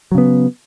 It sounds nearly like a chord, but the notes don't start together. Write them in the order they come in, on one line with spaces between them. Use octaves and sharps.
F#3 C#3 B3